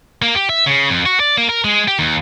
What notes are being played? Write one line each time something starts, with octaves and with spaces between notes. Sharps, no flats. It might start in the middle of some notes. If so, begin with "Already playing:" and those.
A#3
G4
E5
C#3
F2
F#4
D5
A#3
A#4
G#3
G4
D#2